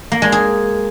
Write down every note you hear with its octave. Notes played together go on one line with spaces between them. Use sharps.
A#3
G#3
G#4